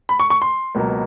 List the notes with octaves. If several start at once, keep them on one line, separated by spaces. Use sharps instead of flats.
B5
C#6
C#6
C6
C#2 B2 F#3 A#3